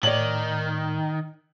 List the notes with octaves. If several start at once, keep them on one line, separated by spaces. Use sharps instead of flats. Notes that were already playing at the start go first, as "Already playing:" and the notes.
A2 D#3 C#5 D5 F#7